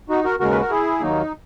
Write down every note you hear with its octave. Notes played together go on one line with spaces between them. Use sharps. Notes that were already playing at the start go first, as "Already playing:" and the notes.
D#4 F#4
F#4 A#4
D#2 C#3 G#3 F#4 A#4
B4
A#4
E4 G#4
D#2 D#3 F#3 A#3 D#4